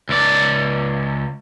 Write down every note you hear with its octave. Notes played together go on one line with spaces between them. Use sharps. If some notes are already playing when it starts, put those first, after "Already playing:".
C#2 D5